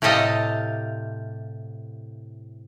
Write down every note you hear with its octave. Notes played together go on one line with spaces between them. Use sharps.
A2 C3 G4 A4 D#5 F5